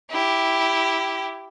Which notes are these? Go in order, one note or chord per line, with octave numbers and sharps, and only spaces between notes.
E4 G4